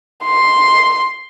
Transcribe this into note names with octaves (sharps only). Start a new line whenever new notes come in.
C6